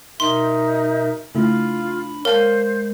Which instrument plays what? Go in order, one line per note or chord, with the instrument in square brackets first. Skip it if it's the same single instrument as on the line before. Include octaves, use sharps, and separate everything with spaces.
[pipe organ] B2 A#4 E5 [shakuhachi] D#4 [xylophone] C6
[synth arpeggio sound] C#3 A3 E4 [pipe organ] D4 B5 [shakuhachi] F4
[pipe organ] G#3 [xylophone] A#4 [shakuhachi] C5 [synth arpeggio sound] C#5 F5 A5